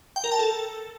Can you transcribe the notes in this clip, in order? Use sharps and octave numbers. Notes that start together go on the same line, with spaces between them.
G5
A#4
A5
A4